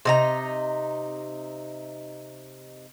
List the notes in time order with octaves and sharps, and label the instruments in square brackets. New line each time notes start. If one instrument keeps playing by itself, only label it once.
[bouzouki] C3 D#4 A#5